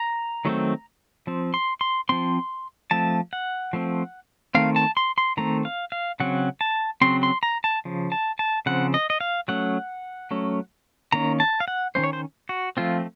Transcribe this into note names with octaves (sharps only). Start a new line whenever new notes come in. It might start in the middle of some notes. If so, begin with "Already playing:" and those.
Already playing: A#5
D#3 F#3 A3 C4
F3 C4
C6
C6
F3 C4 C6
F3 A3 C4 A5
F#5
F3 A3 C4
D#3 A3 C4 F5
A5
C6
C6
D#3 A3 C4 A#5
F5
F5
C#3 F#3 C4 F#5
A5
C#3 F#3 C4 C6
C6
A#5
A5
C#3 F3
A5
A5
C#3 F3 C4 F#5
D#5
D#5
F5
F#3 A3 C#4 F#5
F#3 A3 C#4
D#3 A#3 C#4 A#5
A5
F5
F#5
D#3 A#3 C#4 C5
C#5
C5
F#4
F3 A3 C4 F4